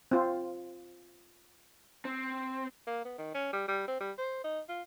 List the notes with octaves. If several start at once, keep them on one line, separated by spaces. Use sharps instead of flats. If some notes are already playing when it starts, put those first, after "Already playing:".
C4 F4
C4
A#3
B3
D#3
C#4
G3
G3
C4
G3
C5
D#4
F4